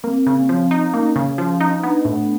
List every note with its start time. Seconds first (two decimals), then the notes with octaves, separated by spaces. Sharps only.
0.04 A#3 C4
0.26 C#3
0.49 F3
0.71 D#4
0.93 A#3 C#4
1.16 C#3
1.38 F3
1.61 D#4
1.83 B3 D4
2.05 A2